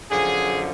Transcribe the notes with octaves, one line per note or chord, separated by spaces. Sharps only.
F#2 D3 F3 G#4